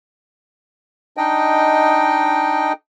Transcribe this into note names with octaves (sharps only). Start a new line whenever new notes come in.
D4 D#4 D#5 G5